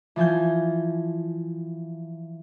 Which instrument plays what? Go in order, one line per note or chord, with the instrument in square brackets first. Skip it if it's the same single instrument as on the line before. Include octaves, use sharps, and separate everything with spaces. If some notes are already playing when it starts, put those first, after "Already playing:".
[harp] E3 F3 G#5 G6